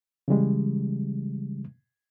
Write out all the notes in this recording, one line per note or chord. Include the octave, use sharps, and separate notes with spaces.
C#3 E3 G3 G#3